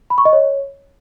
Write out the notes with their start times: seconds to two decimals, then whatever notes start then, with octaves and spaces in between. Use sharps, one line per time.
0.10 B5
0.18 C#6
0.25 D#5
0.33 C#5